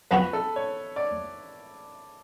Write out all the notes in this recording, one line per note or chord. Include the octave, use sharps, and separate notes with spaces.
F3 B3 F#4 B4
A4
C#5
D5